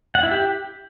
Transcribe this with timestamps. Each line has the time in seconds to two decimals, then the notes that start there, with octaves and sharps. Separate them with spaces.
0.15 F#5
0.23 E4
0.31 G4